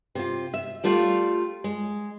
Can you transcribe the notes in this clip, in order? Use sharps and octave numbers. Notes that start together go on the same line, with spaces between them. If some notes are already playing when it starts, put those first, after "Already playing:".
C3 F4
E5
G3 A3 F4 D5 F5
G#3